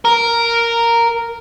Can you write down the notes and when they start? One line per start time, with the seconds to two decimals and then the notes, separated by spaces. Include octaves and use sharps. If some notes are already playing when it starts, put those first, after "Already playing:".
0.05 A#4